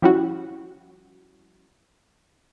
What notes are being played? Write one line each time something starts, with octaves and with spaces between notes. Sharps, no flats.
F3 G3 C#4 E4 F#4